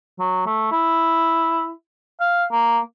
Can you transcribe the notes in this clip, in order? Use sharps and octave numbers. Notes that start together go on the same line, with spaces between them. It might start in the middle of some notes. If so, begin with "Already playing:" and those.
F#3
A3
E4
F5
A#3